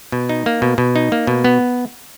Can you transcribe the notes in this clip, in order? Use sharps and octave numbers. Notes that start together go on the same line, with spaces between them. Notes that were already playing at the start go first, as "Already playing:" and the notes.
B2
D#4
A#3
B2
B2
D#4
A#3
B2
B3